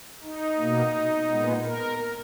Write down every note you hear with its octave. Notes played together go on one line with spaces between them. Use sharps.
D#4
B2 A#3
A#2 G#3 B3
A#4